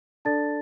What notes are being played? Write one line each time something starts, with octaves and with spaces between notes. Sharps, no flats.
D4 A4 D5 A5 A6